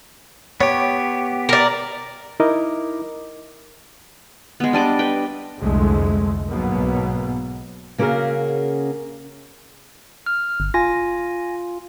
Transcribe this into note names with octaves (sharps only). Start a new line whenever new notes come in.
B3 G4 C#5
A#4 D5
D#4 E4 A#4 D#5 D6
G#3 B3
G3 D4 D#5 D6
B4 G5
C2 F2 D3 G#3 A3
B1 G#2 B2 F#3 A#3 B3
C#3 A#3 C#4 F#4 G#4 A#4
F6
G1
F4 G#5 A#6